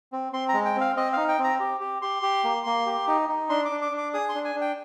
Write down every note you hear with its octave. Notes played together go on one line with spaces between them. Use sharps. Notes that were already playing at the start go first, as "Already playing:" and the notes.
C4
C4 C6
A#5
G#3
G5
C4 F5
C4 D#5
D#4 F5
G5
C4
A#5
G4
G4
G4 C6
G4
A#3
A#3
G4
D#4
D#4
D4 C6
D6
D4
D6
D4
D6
G#4 D#6
C6
D4
G#5
D4
G5